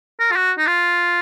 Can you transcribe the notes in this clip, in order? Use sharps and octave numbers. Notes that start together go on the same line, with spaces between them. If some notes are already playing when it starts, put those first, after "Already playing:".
A#4
F4
F#4
D#4
F4